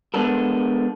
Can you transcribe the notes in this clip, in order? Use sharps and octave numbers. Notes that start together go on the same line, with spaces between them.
G#3 B3 D4 F#4 A4 A#4